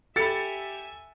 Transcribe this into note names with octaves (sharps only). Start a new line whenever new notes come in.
G4 A4 E5 G#5 B5 A6 C#7